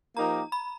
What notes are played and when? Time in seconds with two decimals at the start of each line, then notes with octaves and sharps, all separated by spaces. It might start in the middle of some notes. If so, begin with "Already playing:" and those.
0.17 F3 A#3 D#4 G4 A#4 A#5
0.52 B5